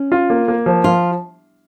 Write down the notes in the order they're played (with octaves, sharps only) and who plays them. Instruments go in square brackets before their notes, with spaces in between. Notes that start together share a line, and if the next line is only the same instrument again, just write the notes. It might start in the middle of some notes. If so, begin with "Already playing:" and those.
Already playing: [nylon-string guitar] C#4
[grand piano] F4
A#3
A#3
F3
[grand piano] F3 [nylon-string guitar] F4